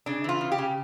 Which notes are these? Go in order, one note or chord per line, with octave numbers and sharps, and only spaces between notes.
C#3 D4
E3 F4
C#3
G4
C#3